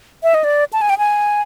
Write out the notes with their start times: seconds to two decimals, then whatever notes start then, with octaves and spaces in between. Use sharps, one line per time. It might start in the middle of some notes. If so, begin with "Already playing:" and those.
0.23 E5
0.34 D#5
0.44 D5
0.73 A5
0.82 G#5
0.90 G5
0.98 G#5